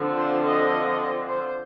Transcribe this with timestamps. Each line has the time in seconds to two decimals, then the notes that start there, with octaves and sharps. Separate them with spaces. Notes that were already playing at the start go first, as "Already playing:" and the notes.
Already playing: D3 F3 C4
0.16 C5
0.44 D#5
1.28 C5